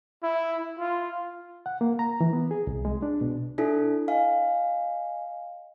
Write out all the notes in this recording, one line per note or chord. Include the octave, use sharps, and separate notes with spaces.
E4
F4
F#5
A#3
A#5
E3
B3
G#4
C2
G#3
D4
B2
D4 E4 A4
D#5 F5 G#5